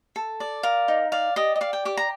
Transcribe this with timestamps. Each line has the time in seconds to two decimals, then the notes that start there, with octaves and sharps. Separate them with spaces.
0.16 A4
0.40 D5
0.63 A#4 F5
0.88 D#4
1.12 D5 F5
1.36 G4 D#5
1.56 D#5
1.61 D5 F5
1.73 G5
1.85 G4 D6
1.97 A#5